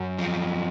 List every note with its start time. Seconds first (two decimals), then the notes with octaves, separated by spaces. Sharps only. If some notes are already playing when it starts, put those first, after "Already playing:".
Already playing: F#2 C#4
0.19 F3